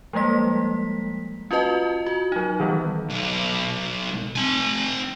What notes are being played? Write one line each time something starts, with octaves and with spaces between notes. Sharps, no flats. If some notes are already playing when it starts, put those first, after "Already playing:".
F3 G3 G#3 A#3 B6
C#4 F4 F#4 B4 D#5 A5
F#4
F#3 D#4
D#3 E3 G3 B3
B1
C4 G#5